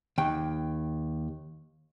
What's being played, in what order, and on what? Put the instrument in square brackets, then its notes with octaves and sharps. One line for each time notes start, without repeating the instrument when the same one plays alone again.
[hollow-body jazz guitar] D#2 G5